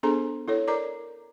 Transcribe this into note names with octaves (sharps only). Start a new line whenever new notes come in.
B3 D4 G#4 A4 C5 A#5
E4 A4 C#5
A#4 D5 A#5 D6